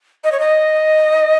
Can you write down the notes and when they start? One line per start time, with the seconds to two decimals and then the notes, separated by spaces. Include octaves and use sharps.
0.24 D#5
0.32 C#5
0.40 D#5